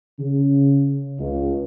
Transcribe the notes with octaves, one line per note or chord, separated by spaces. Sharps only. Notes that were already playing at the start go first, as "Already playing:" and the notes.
C#3
C#2